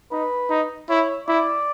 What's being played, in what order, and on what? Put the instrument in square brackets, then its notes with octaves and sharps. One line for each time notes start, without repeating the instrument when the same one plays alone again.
[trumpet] D#4 [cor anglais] B4
[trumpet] D#4
[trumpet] E4 [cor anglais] C#5
[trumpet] E4 [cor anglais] D5